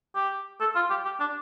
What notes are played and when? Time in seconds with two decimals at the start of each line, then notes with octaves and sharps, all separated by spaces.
0.15 G4
0.61 A4
0.76 F4
0.90 G4
1.05 G4
1.20 D4